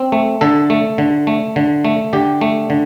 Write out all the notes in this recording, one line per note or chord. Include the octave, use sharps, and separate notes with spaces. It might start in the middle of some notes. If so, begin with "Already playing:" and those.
Already playing: C4
A3
D3 A4
A3
D3
A3
D3
A3
D3 G4
A3
D3